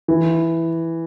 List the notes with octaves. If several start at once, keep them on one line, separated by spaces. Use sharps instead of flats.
E3